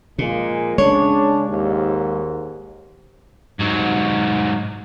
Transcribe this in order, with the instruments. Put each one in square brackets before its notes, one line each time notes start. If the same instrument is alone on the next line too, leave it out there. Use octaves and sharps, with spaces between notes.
[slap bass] A#2 [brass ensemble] F3 G#3 A#3
[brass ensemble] C#3 D4 [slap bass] G#3 [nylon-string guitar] C#5
[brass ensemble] D#2 G#2
[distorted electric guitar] G#2 F#3